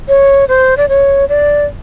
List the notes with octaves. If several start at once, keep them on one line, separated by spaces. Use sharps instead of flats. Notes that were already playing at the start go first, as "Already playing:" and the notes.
C#5
C5
D5
C#5
D5